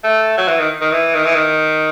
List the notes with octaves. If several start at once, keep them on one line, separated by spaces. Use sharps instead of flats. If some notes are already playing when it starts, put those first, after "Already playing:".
A3
F#3
E3
D#3
D#3
E3
D#3
E3
D#3